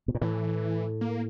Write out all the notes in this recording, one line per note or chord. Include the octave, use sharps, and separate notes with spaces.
B2
A#2
A2 E3
A#3